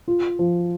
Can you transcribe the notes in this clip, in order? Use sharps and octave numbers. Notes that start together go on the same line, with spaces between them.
F4
F3